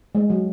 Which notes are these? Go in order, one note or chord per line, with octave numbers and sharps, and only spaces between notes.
G#3
F#3